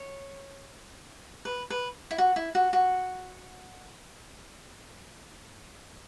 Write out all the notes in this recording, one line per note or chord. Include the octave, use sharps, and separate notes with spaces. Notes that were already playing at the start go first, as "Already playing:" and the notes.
Already playing: C#5
B4
B4
E4
F#4
E4
F#4
F#4